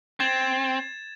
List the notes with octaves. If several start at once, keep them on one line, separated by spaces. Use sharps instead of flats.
C4 G#6 A6 E7